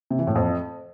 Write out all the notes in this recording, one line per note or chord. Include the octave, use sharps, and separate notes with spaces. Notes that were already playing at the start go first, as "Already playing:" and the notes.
C3
E3
A2
F2